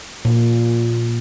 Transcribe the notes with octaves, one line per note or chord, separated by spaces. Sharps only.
A#2